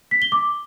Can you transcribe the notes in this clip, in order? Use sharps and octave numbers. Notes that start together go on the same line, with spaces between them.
B6
G7
D6